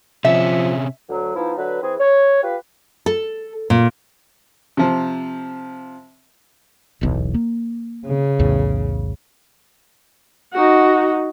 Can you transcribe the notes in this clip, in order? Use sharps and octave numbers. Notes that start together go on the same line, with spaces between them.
C3 F3 C#4 E5
D2 F#3
F3 B3 D#4 E4
D3 F#3 B4
E3 C4 G#4
C#5
F4 G4 B4
A4
A#2
C3 F3
D1 B1 E2
A#3
C#3
B1 E2 A2
D#4 F#4